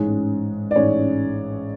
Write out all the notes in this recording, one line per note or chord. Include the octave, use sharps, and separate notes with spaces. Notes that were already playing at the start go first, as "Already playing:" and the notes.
Already playing: A1 G#2 G#3 C#4 G#4
D5
A1 G#2 G#3 C#4 C#5